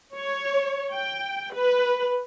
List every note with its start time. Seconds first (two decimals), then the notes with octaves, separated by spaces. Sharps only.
0.15 C#5
0.93 G5
1.55 B4